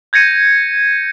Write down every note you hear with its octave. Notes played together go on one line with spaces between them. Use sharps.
G6 G#6 A#6 C#7 D#7